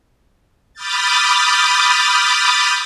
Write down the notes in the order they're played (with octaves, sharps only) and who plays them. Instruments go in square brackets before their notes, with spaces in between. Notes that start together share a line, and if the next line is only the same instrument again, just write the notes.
[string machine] B5 D6 D#6 F6 G6 A6